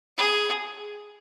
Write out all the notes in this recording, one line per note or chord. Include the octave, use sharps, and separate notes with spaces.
G#4